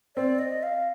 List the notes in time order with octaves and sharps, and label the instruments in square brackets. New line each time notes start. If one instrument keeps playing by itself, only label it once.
[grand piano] C4 [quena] D5
[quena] D#5
F5